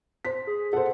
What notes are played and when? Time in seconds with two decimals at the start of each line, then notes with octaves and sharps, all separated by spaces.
0.25 C5 B6
0.47 G#4
0.73 A4 C5 F#5